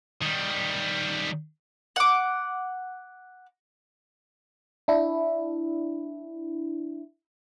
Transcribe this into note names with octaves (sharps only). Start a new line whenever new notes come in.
D#3 G3
F#5 D6
D4 E4